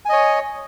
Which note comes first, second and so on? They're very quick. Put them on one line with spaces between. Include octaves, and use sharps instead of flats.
G#5 D#5 C#5